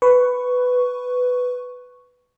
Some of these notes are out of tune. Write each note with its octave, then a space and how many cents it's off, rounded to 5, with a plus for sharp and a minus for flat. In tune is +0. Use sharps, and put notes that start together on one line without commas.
B4 +10 C#6 +0